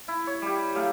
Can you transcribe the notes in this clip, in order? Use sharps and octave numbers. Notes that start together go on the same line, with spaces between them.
E4
C#5
G3 G4
F#3 A3 G4 F5